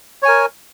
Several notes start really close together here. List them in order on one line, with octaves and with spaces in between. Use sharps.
C#5 G#5 A#4